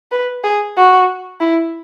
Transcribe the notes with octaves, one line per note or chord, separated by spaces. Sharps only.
B4
G#4
F#4
E4